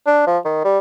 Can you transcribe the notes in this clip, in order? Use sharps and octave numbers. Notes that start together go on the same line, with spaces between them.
D4
F3
D#3
G3